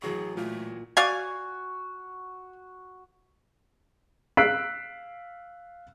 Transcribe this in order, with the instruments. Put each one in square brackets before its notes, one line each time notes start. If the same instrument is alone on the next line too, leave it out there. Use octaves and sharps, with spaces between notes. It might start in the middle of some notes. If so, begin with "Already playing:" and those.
[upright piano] A1 F#3 C#6 [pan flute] G#4
[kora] A#2 [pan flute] A3
[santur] F#4 [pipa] D5 F5 G#5
[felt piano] F5 E6 F#6 B6 C7 D7